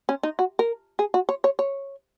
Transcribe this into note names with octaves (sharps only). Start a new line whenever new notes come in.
C#4
D#4
F#4
A#4
G#4
F#4
C#5
C#5
C#5